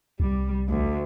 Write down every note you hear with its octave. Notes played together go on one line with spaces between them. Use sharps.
C2 G3
D2